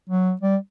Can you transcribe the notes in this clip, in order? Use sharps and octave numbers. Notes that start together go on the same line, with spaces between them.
F#3
G3